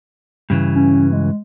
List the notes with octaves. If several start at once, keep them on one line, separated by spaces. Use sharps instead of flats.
G2 C#3 E3
C#4
G#3